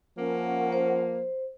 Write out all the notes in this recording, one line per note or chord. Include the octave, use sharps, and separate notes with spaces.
F3 A#3 C#4 A#4 F#5
C5